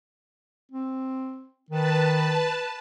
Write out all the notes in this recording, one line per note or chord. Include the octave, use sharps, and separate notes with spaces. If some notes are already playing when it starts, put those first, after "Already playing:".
C4
D#3 B4 A5